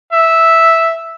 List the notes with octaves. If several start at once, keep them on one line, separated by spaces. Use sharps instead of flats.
E5